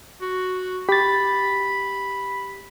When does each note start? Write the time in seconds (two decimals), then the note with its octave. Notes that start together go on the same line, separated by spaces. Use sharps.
0.21 F#4
0.89 G4 B5 A6